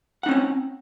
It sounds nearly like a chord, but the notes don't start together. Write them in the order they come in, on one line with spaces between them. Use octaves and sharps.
F#5 D#4 C#4 C4